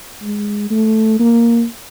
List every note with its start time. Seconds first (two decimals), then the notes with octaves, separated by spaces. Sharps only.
0.23 G#3
0.70 A3
1.19 A#3